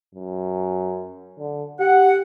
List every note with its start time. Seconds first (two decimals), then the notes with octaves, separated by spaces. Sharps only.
0.15 F#2
1.39 D3
1.80 G4 F#5